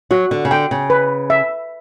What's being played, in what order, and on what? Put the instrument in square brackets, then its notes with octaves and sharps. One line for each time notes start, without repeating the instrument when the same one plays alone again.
[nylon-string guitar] F#3 [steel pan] F#4
[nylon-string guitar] D3
C#3
[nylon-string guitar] D3 [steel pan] G5
[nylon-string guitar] C#3
[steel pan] B4
E5